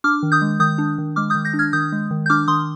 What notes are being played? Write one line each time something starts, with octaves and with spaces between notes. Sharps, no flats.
D4 D6 F6
D#3
D#6 G6
G#3
D#3 D#6 G6
D4
D#3
G#3 D6 F6
D#6 G6
D#3
G6 A#6
D4
F6 G#6
D#3 D#6 G6
G#3
D#3
G6
D4 D6 F6
D#3 C6 D#6